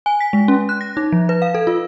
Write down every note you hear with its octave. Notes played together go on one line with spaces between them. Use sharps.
G#5
B6
G#3
C#4
F#6
A#6
D#4
F3
B4
F5
A4
F4